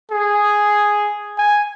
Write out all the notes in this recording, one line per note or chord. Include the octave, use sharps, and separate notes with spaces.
G#4
G#5